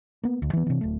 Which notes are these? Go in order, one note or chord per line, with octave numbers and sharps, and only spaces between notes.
A#3 B3
D2
E3 B3
C3 E3
D1 A3